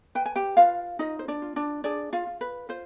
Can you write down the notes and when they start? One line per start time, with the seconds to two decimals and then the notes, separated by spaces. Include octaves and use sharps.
0.15 B4 G5
0.26 G#5
0.36 G4 G5
0.57 F4 B4 F5
0.99 D#4 F4 D#5
1.19 C5
1.28 D4 D5
1.42 F4
1.56 D4 D5
1.84 D4 G#4 D5
2.13 F4 F5
2.27 F4
2.41 B4
2.69 F4 C5